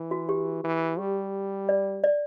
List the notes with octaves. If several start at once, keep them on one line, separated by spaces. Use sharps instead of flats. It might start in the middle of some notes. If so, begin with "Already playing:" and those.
Already playing: E3
F#4
G4
E3
G3 G4
D5
D5